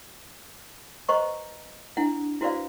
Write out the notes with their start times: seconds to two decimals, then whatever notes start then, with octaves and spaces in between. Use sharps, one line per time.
1.09 B4 C5 D#5 A#5 C#6
1.97 D4 E4 F#5
2.41 E4 F#4 B4 C5 D5 F5